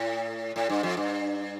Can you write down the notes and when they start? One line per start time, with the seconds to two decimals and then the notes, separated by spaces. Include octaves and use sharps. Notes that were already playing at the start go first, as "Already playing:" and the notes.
Already playing: A2
0.56 A2
0.69 G2
0.83 F2
0.97 G2